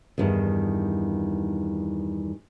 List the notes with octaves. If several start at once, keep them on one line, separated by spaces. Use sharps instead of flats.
E2 G2 D#3